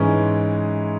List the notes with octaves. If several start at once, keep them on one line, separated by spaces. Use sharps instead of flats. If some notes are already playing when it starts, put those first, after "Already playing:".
Already playing: G#2 E3 G#3 C#4